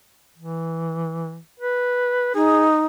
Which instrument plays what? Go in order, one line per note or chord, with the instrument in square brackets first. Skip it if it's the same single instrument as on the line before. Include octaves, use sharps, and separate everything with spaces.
[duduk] E3
B4
[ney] D#4 [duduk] G#4